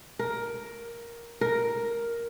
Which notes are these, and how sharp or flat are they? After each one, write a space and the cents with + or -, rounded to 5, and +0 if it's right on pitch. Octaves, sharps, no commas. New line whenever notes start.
A#4 +10
A#4 +5